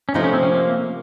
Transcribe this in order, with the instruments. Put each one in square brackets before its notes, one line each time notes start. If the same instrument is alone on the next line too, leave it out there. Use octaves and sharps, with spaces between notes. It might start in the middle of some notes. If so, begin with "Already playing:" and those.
[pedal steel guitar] C#4
[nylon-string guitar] C3 F3 A3 [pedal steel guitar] D#4
[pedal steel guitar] C#4
C4
C#4
A#3